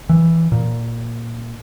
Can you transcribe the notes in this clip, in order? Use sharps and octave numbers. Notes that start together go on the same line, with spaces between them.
E3
A#2